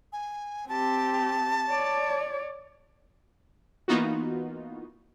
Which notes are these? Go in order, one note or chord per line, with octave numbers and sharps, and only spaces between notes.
G#5
C4 G4 A5
C#5 D5
E3 A#3 B3 D#4 F4 F#4